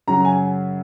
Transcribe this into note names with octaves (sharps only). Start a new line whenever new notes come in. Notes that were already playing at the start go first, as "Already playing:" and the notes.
F#2 C#3 F#3 A#5
G#5